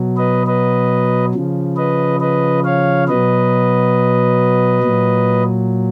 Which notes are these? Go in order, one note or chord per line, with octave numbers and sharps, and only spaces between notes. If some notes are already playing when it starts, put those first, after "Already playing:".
Already playing: B2 F#3
B4 D#5
B4 D#5
C#3 F3
B4 D#5
B4 D#5
C#5 F5
B2 F#3 B4 D#5
A#2 F#3